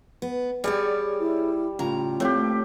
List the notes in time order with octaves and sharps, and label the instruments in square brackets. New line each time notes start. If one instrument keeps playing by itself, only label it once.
[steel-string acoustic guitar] B3
[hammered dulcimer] G3 [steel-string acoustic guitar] G#4 C#5 D5
[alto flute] E4
[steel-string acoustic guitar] A2 C#3 A#5 [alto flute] F4
[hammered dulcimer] A2 G4 [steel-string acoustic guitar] A#3 C4